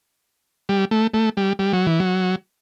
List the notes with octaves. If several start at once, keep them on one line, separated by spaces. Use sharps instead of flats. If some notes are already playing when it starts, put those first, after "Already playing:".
G3
A3
A3
G3
G3
F#3
E3
F#3